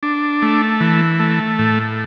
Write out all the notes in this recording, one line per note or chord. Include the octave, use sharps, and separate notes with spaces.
D4
A3
E3
A3
A2